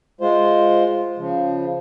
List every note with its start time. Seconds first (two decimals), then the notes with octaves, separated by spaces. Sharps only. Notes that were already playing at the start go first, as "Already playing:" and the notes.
0.21 G#3 F4 C5
1.17 C#3 F3